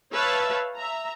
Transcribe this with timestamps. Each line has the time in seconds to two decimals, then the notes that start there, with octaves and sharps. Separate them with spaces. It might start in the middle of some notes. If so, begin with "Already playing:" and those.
0.13 B4 C#5 E5 F5 A5
0.77 E5 A#5